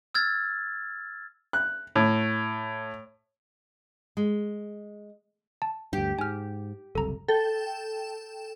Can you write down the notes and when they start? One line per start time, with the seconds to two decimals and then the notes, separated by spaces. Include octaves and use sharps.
0.14 E6 F6 G#6 A6
1.53 F#6
1.96 A2
4.17 G#3
5.62 A5
5.93 D2 G2 G4
6.19 G#2 G#5 F6
6.95 F#1 C2 A4 A#5
7.28 A4 G5